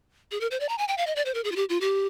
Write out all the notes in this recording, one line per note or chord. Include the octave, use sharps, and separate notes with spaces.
G#4
A#4
C5
D5
A#5
G#5
G5
F5
D#5
D5
C5
A#4
G#4
F4
G4
F4
G4